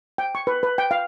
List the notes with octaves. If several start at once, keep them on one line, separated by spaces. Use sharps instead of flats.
G5
C#6
B4
B4
G5
F5